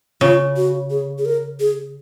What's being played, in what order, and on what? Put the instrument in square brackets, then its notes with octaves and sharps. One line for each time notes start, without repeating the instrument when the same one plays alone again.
[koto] C#3 [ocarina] F4
[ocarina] F#4
G#4
G#4
A#4
G#4